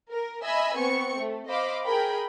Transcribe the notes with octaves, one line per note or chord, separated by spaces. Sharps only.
A#4
D#5 E5 G#5 B5 E6
B3 C4 C#6 C#7
A3
C5 D#5 F5 B5 D6
G#4 A#4 G5 B5